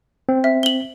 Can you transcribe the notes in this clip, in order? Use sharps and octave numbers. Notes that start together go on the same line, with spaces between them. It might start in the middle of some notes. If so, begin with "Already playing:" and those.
C4
E5
F#7 G7